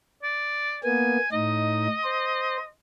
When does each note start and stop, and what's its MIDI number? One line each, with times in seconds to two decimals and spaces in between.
0.23 0.77 74
0.84 1.17 58
0.84 1.17 59
0.84 1.31 80
1.32 1.87 45
1.32 1.87 63
1.32 2.69 75
2.04 2.58 72